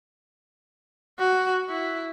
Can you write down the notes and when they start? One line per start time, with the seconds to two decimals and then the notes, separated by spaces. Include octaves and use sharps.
1.19 F#4
1.69 E4